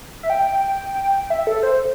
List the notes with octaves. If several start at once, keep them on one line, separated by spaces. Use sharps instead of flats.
E5
G5
E5
A4
C5